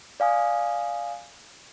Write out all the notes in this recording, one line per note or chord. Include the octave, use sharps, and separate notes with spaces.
D5 F5 G#5 D#6